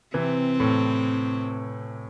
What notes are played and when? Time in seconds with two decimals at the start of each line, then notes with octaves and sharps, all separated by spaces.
0.14 C3 E3 C4
0.60 A2